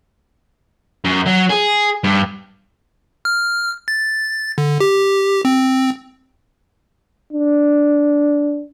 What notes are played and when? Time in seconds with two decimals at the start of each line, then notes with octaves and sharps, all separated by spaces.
1.04 F#2
1.26 F#3
1.50 G#4
2.04 G2
3.25 F6
3.88 A6
4.58 D3
4.80 G4
5.45 C4
7.33 D4